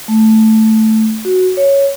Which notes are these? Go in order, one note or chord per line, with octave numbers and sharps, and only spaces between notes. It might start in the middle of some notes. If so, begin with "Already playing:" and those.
A3
F#4
C#5